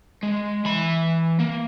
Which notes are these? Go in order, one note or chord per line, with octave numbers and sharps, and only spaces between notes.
G#3
E3 B5
A#3